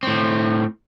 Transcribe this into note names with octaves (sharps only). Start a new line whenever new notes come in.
A2 C4